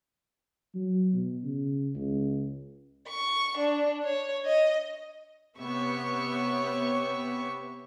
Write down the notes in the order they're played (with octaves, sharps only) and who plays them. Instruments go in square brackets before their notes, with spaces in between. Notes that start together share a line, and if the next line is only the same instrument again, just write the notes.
[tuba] F#3
B2
C#3
C#2
[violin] C#6
D4
C#5
D#5
[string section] C3 B3 G4 C#5 E5 C#6